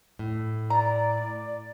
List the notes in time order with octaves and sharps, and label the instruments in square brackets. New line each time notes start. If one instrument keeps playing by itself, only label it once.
[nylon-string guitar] A2
[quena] D5 [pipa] A#5